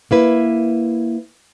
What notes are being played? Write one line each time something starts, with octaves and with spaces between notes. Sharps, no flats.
A#3 E4 B4